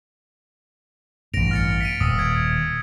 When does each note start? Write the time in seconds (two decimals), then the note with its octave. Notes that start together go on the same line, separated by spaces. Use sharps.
1.34 A1 G2 A#6 D7 F7
1.51 F6 A6 C#7
1.81 B6 D7 D#7
2.01 D#1 D#6 E6
2.19 G#6